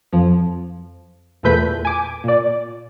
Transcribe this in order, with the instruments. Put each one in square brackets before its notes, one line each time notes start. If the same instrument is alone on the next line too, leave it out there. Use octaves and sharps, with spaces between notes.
[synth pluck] F2 F3
E2 A#2 A3 B4 G6 B6
G#5 D6
A#2 D5